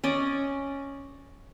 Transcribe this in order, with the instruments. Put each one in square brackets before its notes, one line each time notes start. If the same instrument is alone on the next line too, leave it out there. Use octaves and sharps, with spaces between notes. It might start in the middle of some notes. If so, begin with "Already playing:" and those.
[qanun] C#4 D5 D#5